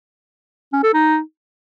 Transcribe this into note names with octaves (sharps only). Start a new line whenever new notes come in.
C#4
A4
D#4